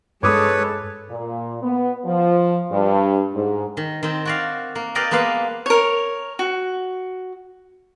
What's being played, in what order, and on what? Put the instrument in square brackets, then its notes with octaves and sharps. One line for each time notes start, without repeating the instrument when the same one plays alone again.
[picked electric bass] G2 D4 [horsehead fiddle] G#3 A4 [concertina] B4 C#5 [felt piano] D6 D#6
[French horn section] A#2
B3
F3
G2
G#2
[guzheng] D#3
D#3 C4
F#4 D5 F5
A#3
G4 A#4 B4 D5 D#5 F5
G#3 A#3 B3 B4 F5
[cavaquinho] A#4 C#5
F#4